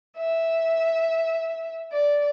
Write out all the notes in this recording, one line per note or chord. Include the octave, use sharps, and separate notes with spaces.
E5
D5